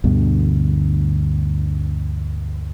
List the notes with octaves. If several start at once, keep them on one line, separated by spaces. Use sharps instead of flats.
D2 G2 B2 D3